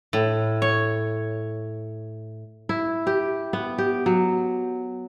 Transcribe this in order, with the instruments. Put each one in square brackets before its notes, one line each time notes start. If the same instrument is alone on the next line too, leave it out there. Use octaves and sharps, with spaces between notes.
[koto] A2
C#5
[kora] E4
G4
B3
G4
F#3